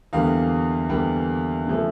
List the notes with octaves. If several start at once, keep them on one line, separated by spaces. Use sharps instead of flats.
E2 D3 G3 A#3 F5
E2 D3 G3 A#3
C#3 F3 A3